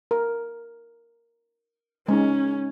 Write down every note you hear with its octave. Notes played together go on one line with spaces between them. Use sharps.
A#4
G#3 C#4 D#4